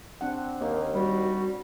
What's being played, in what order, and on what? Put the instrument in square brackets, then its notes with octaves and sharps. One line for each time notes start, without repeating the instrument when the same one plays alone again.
[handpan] C4 D4 F#5
[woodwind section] D#2 [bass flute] A#3
[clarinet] G3 [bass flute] F#4